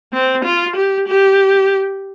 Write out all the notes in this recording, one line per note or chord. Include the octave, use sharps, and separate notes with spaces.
C4
F4
G4
G4